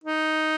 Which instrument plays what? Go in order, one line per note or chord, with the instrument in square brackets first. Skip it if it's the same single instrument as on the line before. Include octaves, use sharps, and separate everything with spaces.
[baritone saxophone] D#4